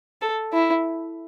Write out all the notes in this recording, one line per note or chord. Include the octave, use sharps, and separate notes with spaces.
A4
E4